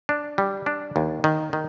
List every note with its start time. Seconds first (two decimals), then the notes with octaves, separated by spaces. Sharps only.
0.09 D4
0.38 G3
0.66 D4
0.96 D#2
1.24 D#3
1.53 D#3